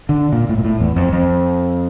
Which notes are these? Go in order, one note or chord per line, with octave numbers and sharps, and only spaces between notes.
D3
A#2
A2
A#2
A2
E2
F2
F2